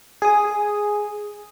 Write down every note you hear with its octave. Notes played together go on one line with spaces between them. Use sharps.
G#4 D#6